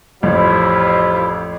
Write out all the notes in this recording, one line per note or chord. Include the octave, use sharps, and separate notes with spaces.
A1 F2 F3 G3 E4